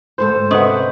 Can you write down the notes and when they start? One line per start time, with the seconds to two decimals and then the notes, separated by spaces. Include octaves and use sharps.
0.18 D2 G#2 A4 C5
0.51 C3 B4 D#5 F#5 C#6 D#6